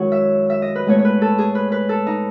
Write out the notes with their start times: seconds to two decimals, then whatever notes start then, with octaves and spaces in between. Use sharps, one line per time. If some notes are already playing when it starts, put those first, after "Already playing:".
Already playing: F#2 D#3 G#3 E4 F#4 C#5 F#5
0.12 E5
0.50 E5
0.62 D#5
0.75 B4
0.86 A2 G#3 B3 C#5
0.99 C#5
1.05 B4
1.22 A4
1.38 G#4
1.55 B4
1.72 B4
1.89 A4
2.07 D#4